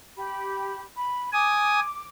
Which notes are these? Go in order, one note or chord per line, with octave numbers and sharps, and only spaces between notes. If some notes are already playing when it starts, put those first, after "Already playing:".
G4 B5
B5
G#5 D6 D#6